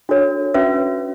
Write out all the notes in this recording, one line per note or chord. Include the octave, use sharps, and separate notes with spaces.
D4 F#4 A4 C#5
C#4 F#4 B4 E5